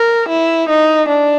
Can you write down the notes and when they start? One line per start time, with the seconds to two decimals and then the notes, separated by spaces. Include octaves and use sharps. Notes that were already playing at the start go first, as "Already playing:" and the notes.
Already playing: A#4
0.29 E4
0.70 D#4
1.09 D4